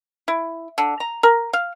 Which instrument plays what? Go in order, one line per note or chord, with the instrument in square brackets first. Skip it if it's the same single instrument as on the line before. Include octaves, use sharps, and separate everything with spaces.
[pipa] E4
D3
A#5
A#4
F5